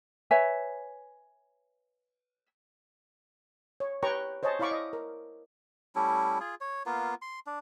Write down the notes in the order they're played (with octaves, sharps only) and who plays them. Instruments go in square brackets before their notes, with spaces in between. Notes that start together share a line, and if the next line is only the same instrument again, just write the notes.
[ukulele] B4 C#5 E5 G#5
[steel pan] C#5
G4 B4 C#5 G5 A#5 C#6
C5 C#5 D#5 G#5 A5
E4 D5 F5 B5 C#6 D6
D#5
A#4
[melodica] G3 A3 C#4 E4
F4 G#4
C#5
A#3 B3 F4
C6
D4